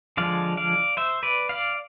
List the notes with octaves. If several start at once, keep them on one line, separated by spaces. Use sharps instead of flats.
D3 F3 G#3 D5 F5
D5 F5
C5 E5
B4 D5
D5 F5